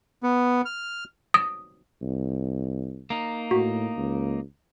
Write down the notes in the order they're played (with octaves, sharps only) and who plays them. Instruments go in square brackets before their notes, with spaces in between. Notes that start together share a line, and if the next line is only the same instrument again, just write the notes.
[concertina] B3
F6
[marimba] D#6
[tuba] C2
[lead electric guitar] A#3 D#4
[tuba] A2 [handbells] F#4
[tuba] C#2